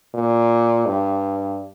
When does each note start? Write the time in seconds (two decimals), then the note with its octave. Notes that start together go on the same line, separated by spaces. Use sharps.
0.14 A#2
0.86 G2